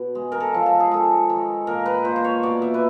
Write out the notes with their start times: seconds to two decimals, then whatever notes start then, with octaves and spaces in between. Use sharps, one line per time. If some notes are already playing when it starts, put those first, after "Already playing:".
Already playing: B2
0.15 G#3
0.32 A#4
0.40 A4
0.54 F3
0.66 A4
0.80 G#4
0.91 G#3 A4
1.30 D#3
1.67 A#2 A#4
1.86 B4
2.05 A#2 C5
2.16 C5
2.24 C#5
2.43 B2 D5
2.62 E5
2.74 B4